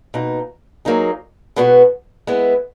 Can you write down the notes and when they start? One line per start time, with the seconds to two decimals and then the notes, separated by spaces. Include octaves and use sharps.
0.14 B2 A#3 D#4
0.85 F#3 A#3 D#4 G#4
1.56 B2 G#3 B3 F#4
2.27 G#3 B3 E4